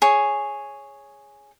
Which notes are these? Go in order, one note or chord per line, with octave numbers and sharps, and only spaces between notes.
G#4 C#5